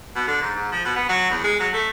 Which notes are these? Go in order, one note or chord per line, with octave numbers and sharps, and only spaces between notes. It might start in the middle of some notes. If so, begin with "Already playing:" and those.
B2
D3
G#2
G#2
F3
B2
B3
F#3
E2
G#3
F#3
A3